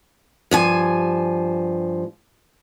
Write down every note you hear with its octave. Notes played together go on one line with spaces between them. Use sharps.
G2 F3 G#5